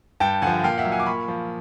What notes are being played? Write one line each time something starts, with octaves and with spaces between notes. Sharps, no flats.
G2 G5 A5
D3 F3 F#5 G#5
A#2 F5 G5
E5 F#5
F#3
F#5 G#5
D6
A#2 B5 C#6
F3